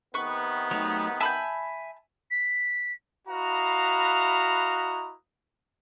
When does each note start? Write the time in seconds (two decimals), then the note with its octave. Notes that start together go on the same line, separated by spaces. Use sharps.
0.14 C3 D#3 B3 B4 C#6
0.71 F#3 A3 D#4
1.20 E5 G#5 A5 B5 E6 G6
2.31 B6
3.27 E4 F#4 B4 D#5 F5 A#5